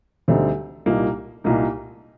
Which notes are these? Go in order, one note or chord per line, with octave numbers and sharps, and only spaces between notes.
D2 D3 G3 C4 D#4
C2 A#2 G3 A#3 D#4
C2 A#2 G3 A#3 D#4